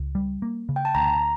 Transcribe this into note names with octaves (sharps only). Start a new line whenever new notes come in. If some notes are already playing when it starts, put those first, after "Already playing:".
Already playing: C#2
G3
A#3
C#3
G5
A5
D2 A#5